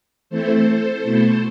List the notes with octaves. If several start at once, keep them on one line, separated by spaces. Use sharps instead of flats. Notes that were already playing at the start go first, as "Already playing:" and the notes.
E3 A3 C4 E4 A4 C5
B2 A3 E4